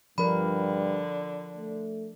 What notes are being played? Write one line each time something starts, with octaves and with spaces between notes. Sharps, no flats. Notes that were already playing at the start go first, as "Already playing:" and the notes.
G2 D3 F3 A#4 B5
A3